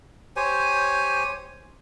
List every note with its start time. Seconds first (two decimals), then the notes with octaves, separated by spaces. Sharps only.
0.36 G4 C5 C#5 G#5